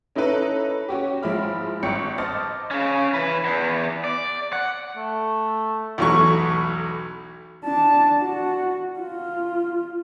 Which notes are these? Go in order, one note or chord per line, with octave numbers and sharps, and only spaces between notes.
C#4 D#4 E4 A4 B4
C#4 F#4 G4
G#2 F3 G#3 E4 B5 F6
G#1 G2 G5 C#6 C#7
C5 D#5 A5 D6 F6 A6
C#3 C#4
E3 B4
E2
D5
F#5
A3
B1 E2 F#3 A3 C#6
D4 A5
F#4
F4